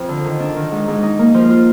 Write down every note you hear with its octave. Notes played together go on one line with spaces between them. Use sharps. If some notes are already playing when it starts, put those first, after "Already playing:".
Already playing: F2
D3
D#3
D4
D#3
G#2
G#2
D#4
A#3
F3
F4